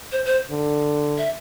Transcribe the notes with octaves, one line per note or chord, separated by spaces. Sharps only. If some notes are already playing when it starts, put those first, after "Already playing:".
C5
C5
D3
E5